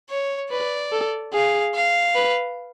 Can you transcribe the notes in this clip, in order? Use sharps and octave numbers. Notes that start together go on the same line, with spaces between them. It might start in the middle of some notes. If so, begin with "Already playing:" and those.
C#5
B4 D5
A4
G#4 F5
F5
B4